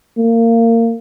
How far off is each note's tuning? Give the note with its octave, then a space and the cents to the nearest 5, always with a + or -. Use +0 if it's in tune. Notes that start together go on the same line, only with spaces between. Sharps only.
A#3 -25